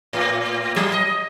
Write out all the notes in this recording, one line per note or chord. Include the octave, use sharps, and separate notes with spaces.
A2
F#3
D#5